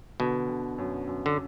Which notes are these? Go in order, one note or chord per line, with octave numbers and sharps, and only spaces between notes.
B2 D3
D3
F#2
F#2
D3